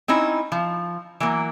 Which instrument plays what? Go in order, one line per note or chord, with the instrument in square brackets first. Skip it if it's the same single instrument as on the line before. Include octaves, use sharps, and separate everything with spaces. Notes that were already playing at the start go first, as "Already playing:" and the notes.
[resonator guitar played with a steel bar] C4 C#4 D#4 E4
F3
E3 F#3 A#3